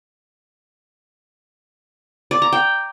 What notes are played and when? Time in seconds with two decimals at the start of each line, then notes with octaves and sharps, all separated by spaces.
2.31 D5
2.42 A#5
2.53 G5